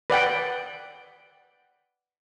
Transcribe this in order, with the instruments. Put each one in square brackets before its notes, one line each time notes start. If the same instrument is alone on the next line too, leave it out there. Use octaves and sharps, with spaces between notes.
[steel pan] B4 D5 F#5 G5